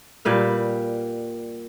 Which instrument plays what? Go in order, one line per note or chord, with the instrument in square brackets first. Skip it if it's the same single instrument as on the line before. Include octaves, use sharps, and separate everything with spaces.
[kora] A#2 G3 B4 F5